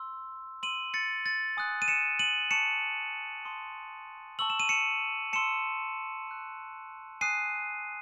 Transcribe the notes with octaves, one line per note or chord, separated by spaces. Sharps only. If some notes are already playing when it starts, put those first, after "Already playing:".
Already playing: C6 E6
C6 E6 D#7 F#7
A6 C#7
A6
G#5 D#6 F#6
D#7
C#7 E7
D#7 F#7
A5 C#6 F#6 C#7 E7
A5 C6 D#6
A5 C#6 E6 F#7
E7
D#7
C#7 E7
A5 C6 E6 C#7 E7
C6 F#6
G#5 D#6 F#6 C7 D#7